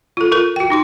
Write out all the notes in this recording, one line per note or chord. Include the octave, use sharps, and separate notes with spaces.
F4 A4
F4 A4 A#4
F#4 G5
D#4 F#4 C6